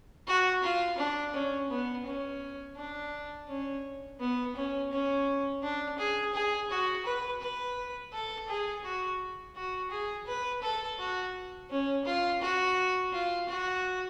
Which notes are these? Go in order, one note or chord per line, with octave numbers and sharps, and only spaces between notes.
F#4
F4
D4
C#4
B3
C#4
D4
C#4
B3
C#4
C#4
D4
G#4
G#4
F#4
B4
B4
A4
G#4
F#4
F#4
G#4
B4
A4
F#4
C#4
F4
F#4
F4
F#4